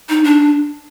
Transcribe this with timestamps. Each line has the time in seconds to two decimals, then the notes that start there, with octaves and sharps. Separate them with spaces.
0.09 D#4
0.24 D4